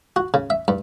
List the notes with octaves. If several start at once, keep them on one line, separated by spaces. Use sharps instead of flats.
F#4
C#3
E5
G2